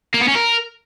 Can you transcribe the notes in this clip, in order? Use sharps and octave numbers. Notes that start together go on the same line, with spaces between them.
A#3
B3
C#4
A#4